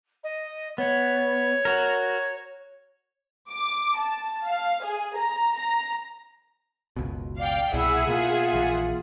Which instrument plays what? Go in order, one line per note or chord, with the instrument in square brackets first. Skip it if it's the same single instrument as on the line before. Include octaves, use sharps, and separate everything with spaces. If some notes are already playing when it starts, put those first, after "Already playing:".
[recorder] D#5
[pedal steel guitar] B3 [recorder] C#5
[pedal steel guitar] F#4 A#4
[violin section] D6
A5
F5
G#4
A#5
A#5
[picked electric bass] F#1 C#2 B2
[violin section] D5 F5 G5
[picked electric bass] C2 B2 [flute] E4 [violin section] G#4 E5 F#5
[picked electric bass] B2 A#3 B3 [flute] F4
[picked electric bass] A#1 E3 A#3